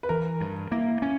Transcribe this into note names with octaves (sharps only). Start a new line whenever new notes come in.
B4
E3 A#4
G2
A#3 E4
C#4